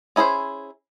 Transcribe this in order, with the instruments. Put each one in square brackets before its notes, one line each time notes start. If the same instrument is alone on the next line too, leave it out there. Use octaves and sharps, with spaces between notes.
[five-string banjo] C#4 E4 G#4 A4 C5